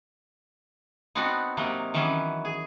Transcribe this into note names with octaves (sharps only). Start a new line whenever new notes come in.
B3 C4 D4 D#4 F#4
C3 F#3 A#3 D#4
D#3 E3 F#3 B3 C#4
G#4